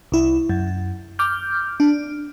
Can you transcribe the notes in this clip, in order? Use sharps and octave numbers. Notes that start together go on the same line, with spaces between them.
C2 E4
F#2
D6 F6 G6
D4